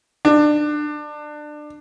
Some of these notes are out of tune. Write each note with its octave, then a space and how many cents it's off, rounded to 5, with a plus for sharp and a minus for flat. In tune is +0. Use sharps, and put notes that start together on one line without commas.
D4 +25